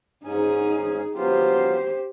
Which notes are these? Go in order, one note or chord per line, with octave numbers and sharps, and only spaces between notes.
G#2 C#4 D#4 G#4 G#5
F#3 B3 F4 G4 C5